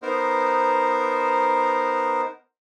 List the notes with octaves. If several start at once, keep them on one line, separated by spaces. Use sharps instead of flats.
B3 D#4 A#4 C5